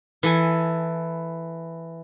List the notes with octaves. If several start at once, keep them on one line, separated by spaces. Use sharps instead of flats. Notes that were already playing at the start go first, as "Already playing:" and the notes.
E3 A4 G#5